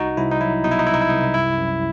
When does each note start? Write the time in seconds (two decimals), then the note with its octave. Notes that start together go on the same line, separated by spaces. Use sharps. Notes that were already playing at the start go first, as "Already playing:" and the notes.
Already playing: C2 D#4 F#4
0.17 C2 E4
0.32 D#4
0.40 F#3 E4
0.64 B2 D#4
0.71 E4
0.79 D#4
0.87 C2 E4
0.94 D#4
1.01 E4
1.09 C2 D#4
1.34 F#2 E4
1.58 F#2